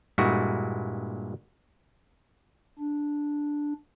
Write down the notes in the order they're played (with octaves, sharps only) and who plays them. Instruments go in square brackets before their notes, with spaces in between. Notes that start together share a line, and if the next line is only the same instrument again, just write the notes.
[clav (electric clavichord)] G2 A#2 G#3 E4 F#4
[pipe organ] D4